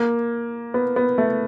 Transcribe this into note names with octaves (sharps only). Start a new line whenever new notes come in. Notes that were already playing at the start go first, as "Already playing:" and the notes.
Already playing: A#3
B3
B3
A3